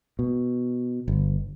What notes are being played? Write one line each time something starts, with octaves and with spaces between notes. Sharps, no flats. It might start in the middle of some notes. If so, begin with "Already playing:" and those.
B2
G1